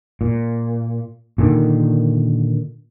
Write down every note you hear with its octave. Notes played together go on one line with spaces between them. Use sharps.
A#2
A#2 D3 D#3